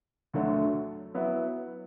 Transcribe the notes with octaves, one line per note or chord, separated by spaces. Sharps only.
D2 D3 F#3 A3
F#3 B3 E4